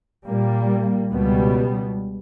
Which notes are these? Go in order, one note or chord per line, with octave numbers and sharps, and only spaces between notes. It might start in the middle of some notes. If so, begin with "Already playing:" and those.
A#2 G3 A#3
C#2 B2 G3 B3